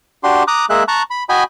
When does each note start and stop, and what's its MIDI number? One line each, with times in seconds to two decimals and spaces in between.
0.24 0.43 62
0.24 0.43 66
0.24 0.43 67
0.24 0.43 84
0.48 0.65 82
0.48 0.65 86
0.48 0.65 87
0.48 0.65 90
0.70 0.83 56
0.70 0.83 58
0.70 0.83 68
0.70 0.83 76
0.70 0.83 90
0.88 1.02 81
0.88 1.02 82
0.88 1.02 85
0.88 1.02 90
1.10 1.23 83
1.29 1.44 66
1.29 1.44 75
1.29 1.44 79
1.29 1.44 80
1.29 1.44 83